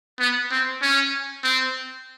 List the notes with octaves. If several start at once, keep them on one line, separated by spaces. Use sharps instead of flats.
B3
C4
C#4
C4